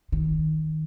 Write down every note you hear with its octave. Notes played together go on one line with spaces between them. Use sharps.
D#3